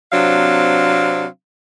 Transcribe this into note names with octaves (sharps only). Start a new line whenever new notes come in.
C3 F#3 C4 D4 F5